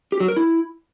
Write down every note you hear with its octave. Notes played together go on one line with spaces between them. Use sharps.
G4
F#3
A#4
E4